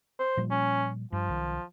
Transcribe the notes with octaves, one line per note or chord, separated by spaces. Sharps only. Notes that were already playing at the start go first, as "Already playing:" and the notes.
C5
A#2 F3 G3
C#4
G2 F3
B1 D#3